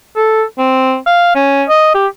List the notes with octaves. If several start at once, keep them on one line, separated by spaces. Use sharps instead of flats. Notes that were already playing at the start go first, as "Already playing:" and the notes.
A4
C4
F5
C#4
D#5
G4